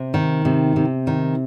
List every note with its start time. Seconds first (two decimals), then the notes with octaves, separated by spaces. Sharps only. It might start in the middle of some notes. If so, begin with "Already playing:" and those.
Already playing: C3
0.14 D#3
0.45 C3
0.76 C3
1.07 D#3